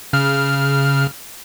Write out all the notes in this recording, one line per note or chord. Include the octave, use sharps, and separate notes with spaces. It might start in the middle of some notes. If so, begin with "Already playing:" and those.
C#3 F6